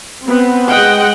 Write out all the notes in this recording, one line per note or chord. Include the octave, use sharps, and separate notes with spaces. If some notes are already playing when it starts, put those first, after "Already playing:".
B3 C4
G#3 D#5 F#5 G5